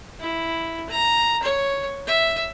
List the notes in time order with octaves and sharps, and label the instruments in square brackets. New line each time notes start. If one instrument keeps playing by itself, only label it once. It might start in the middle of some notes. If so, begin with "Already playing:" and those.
[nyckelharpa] E4
A#5
C#5
E5